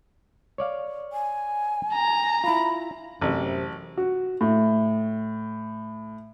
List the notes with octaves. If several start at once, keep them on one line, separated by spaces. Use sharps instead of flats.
C#5 D5 F5
G#5
A#5
E4 F4 B5
A1 F#2 C3
F#4
A2